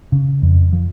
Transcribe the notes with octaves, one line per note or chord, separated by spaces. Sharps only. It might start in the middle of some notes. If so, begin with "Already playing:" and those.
C#3
F2
F3